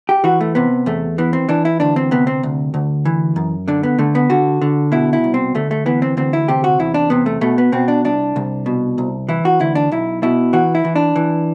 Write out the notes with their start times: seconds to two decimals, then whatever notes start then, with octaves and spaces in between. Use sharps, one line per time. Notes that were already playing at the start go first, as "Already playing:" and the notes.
0.09 G4
0.24 E3 F#4
0.41 A3
0.55 C3 B3
0.86 E2 A3
1.18 E3 B3
1.33 C4
1.49 E3 D4
1.65 E4
1.80 D2 D4
1.96 C4
2.11 C3 B3
2.27 C4
2.43 D2
2.74 D2
3.05 E3
3.36 F#2
3.68 D3 D4
3.83 B3
3.98 D3 A3
4.15 B3
4.30 D3 F#4
4.62 D3
4.92 B2 E4
5.13 E4
5.24 C2
5.34 C4
5.55 D2 A3
5.71 A3
5.86 E3 B3
6.02 C4
6.17 D2 C4
6.33 E4
6.48 C3 G4
6.64 F#4
6.79 E2 E4
6.94 D4
7.10 C3 B3
7.26 A3
7.41 B2 A3
7.58 B3
7.72 B2 C4
7.88 D4
8.05 C2 D4
8.36 C2
8.66 B2
8.98 C2
9.29 E3 E4
9.45 F#4
9.60 D2 E4
9.75 D4
9.91 B1 E4
10.23 B2 E4
10.53 E3 F#4
10.75 E4
10.85 E3
10.96 D4
11.16 E3